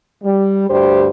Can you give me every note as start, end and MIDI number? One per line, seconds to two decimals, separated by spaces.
0.23 0.67 55
0.69 1.08 38
0.69 1.08 43
0.69 1.08 55
0.69 1.08 67
0.69 1.08 72